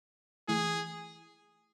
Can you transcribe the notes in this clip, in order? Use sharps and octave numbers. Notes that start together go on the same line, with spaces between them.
E3 A3 E4 G#4